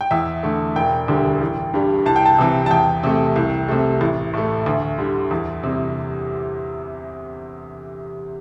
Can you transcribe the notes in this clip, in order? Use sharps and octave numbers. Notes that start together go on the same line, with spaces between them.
G5
E2 E5
D3 A3
E1 G5
D2 D3 G3
A1
G2 G3
C2 A5
G5
A5
C3 E3
A5
E2 G5
C3 A3
C2
C3 A3
A1
A2 A3
D2
D3 G3
E2
C3 G3